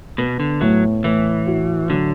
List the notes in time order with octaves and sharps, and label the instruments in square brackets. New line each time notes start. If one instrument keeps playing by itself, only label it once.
[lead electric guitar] B2 [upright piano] B3
[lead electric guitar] D3
[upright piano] A2 [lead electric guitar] F#3
[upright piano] A2 [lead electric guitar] E3
[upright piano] F#4
[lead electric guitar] D3 [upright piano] F#3